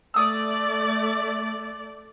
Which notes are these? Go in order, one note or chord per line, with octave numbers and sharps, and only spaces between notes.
A3 D5 D#6 E6